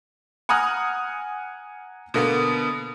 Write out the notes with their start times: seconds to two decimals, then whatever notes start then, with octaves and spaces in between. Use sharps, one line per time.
0.49 F#5 G#5 A#5 D#6 F6 F#6
2.14 B2 D3 A#3 B3